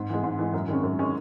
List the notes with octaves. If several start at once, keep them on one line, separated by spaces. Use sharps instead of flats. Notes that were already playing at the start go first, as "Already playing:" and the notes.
Already playing: G#2
E3 G#3
G#2
E3 G#3
F#2
D#3 G#3 C#4
F#2
D#3 G#3 C#4